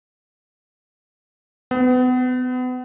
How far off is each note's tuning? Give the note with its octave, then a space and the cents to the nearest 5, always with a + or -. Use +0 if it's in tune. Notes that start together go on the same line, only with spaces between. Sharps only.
B3 +35